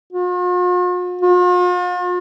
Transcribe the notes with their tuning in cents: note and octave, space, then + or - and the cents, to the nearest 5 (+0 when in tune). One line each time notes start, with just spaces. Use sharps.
F4 +45
F4 +45